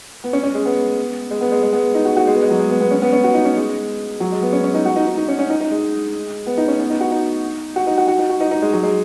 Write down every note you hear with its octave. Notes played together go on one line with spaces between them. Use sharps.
B3
C#4
C#4
G#3
B3
G#3
B3
G#3
G#3
B3
D#4
F#4
F#4
G#3
B3
G#3
F#3
G#3
B3
B3
C#4
B3
C#4
F#4
D#4
C#4
G#3
F#3
G#3
B3
C#4
C#4
D#4
F#4
D#4
D#4
D#4
C#4
C#4
D#4
D#4
G#3
B3
D#4
C#4
B3
D#4
F#4
D#4
F#4
D#4
F#4
F#4
D#4
F#4
D#4
D#4
G#3
F#3
G#3